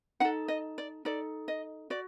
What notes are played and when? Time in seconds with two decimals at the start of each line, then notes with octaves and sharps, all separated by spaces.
0.20 D#4 A4 F#5
0.48 D#5
0.78 D5
1.05 D#4 A4 D5
1.48 D#5
1.90 F#4 D5